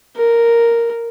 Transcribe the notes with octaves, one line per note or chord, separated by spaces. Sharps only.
A#4